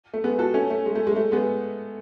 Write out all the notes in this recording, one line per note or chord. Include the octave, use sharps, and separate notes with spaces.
A3
G#3 B3
F#4 A4
A3 C#4
A3
G#3
A3
G#3
A3
G#3 B3